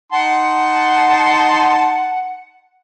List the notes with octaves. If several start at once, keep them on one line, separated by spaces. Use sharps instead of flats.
D#4 F#5 A5 C6